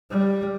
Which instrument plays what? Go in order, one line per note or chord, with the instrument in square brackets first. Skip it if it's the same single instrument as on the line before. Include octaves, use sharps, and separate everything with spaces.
[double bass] G3